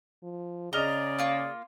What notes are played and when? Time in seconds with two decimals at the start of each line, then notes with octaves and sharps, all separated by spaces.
0.23 F3
0.73 C#3 G#4 D5 D#5 A#5 F6 G7
1.19 A#3 F4 C#6